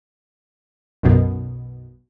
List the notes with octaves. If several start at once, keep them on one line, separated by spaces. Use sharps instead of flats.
B1 F#2 B2